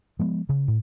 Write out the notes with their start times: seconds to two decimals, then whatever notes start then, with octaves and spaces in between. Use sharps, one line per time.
0.19 F3 G#3 B3
0.49 C#3
0.68 A2